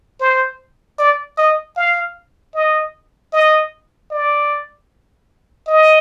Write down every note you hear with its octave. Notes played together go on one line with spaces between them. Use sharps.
C5
D5
D#5
F5
D#5
D#5
D5
D#5